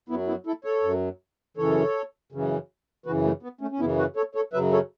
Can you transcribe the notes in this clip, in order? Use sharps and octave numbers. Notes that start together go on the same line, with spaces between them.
F#2 F#3 B3 E4
B3 E4
E4 A4
A4 C#5
F#2 F#3
F#2 C#3 E3 A4 C#5
F#2 C#3 E3
F#2 C#3 E3 F#4 B4
A3
B3
A3 C#4
C#4
F#2 C#3 E3 B3 E4
F#4 B4
A4 C#5
A4 C#5
F#2 C#3 F#3 B4 E5
A4 C#5